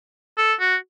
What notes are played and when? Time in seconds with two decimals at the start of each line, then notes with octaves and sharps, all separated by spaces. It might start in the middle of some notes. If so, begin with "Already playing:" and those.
0.38 A4
0.60 F#4